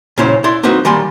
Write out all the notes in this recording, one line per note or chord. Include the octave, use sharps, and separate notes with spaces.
A#2 C#3 C#4 E4 C5 C#5
E4 D5 C6
A#3 C4 D#4 F#4 B4
D#3 G3 A#3 G#5 B5 C6